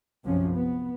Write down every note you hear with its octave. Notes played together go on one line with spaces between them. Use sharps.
B1 F#2 C3 F3 C#4
B3